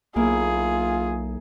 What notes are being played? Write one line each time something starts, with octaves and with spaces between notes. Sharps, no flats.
B1 A#3 B3 E4 F4 G#4